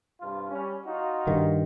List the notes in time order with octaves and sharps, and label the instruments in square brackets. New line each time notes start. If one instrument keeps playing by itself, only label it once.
[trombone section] G2 C3 F4
G3 C#4
D#4 F4 F#4
[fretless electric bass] G2 D#3